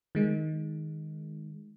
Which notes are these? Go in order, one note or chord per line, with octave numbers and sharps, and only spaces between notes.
D#3 G#3